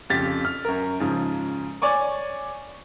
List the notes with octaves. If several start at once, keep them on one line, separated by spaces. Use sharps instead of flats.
F2 C#3 G4 A6 B6
F6
F#2 A#4
G#2 C#3 F3
C#5 D5 G#5 C#6 D6